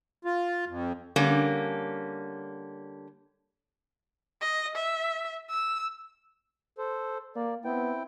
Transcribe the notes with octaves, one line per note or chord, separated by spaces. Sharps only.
F4
F2
D3 G3 A#3 C#4
D#5
E5
E6
A4 C5
A#3 D5
B3 C4 E4 G5